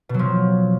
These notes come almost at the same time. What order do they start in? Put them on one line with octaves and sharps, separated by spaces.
B2 F#3 F3